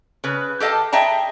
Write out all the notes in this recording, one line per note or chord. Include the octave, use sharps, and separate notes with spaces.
C#3 B4
G4 A4 D#5 F5 A5
G#4 D#5 E5 G5 A5 A#5